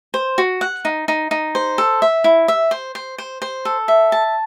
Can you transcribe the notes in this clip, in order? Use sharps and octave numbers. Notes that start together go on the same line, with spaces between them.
C5
F#4
F#5
D#4
D#4
D#4
C5
A4
E5
E4
E5
C5
C5
C5
C5
A4
E5
A5